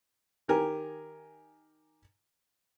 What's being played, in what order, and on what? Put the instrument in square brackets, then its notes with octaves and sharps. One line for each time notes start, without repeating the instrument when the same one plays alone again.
[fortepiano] D#3 G4 A#4 G#5